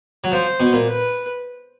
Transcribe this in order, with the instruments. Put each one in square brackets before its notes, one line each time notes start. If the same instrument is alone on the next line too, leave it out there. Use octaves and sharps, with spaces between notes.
[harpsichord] F#3
[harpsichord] F3 [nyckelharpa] C5
[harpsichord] B2
A#2
[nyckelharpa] B4